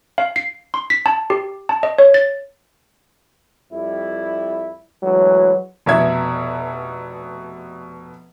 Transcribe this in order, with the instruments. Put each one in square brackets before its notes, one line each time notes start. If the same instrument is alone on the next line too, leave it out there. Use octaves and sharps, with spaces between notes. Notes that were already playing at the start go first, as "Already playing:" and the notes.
[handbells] F5
C7
C6
B6
A5
G4
A5
D#5
C#5
A6
[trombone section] F2 G3 E4
[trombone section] D2 E3 G#3 [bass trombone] F#3
[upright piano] F1 B2 E5 G#6